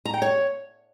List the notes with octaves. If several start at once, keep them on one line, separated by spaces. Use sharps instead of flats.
A#5
G5
C#5